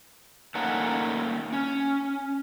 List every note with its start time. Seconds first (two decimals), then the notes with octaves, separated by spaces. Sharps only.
0.55 A3 A#3 C#4 D#4 F#5
1.53 C#4